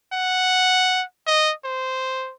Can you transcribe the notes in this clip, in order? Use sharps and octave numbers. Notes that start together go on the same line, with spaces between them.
F#5
D#5
C5